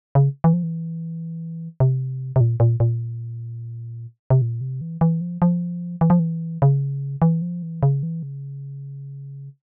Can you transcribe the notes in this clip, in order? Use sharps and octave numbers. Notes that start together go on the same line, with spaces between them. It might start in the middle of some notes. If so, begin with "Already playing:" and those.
C#3
E3
F3
E3
C3
C3
A#2
A#2
A#2
C3
A#2
C3
E3
E3
F3
F3
E3
F3
E3
C#3
E3
F3
E3
C#3
E3
C#3